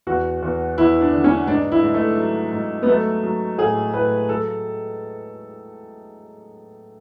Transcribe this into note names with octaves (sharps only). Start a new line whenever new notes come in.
E2 F#4
E2
E2 E4
D4
D3
C#4
G#2 D4
E4
G#2
A3
F#3
G#2
B3
F#3 A3
F#3
A2 G#4
A2 B4
F#3 A4